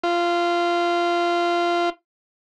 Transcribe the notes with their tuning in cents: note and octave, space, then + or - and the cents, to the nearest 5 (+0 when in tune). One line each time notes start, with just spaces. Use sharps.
F4 -15